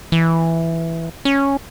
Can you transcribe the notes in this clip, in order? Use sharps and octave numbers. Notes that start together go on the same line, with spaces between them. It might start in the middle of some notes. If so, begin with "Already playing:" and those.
E3
C#4